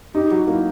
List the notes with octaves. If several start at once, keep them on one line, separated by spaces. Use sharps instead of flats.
D#4 G4
F#3 F#4
A#3 E4